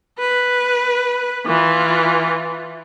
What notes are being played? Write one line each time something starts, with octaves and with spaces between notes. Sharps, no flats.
B4
E3 F4